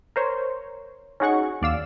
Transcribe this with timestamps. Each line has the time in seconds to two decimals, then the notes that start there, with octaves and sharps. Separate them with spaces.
0.16 A#4 C5 C#5
1.20 C#4 D#4 F#4 G#4 F#5 C#6
1.62 D#2 D5 F5 E6